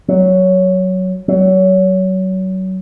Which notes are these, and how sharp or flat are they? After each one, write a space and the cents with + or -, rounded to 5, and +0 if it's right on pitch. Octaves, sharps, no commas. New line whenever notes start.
F#3 +5
F#3 +25